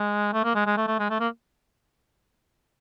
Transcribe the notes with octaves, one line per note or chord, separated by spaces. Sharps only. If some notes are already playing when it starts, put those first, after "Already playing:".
Already playing: G#3
A3
A#3
G#3
G#3
A3
A3
G#3
A3
A#3